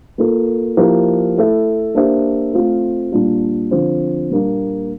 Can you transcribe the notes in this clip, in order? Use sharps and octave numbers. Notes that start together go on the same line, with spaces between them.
A#3 F4 A4
F3 A#3 E4 G4 A#4
A3 E4 A4 E5
A#3 D4 G4 C5 E5
A3 C4 F4
A#2 G3 D4 F4
D3 F3 C4 F4 C5
A#2 G3 A#3 D4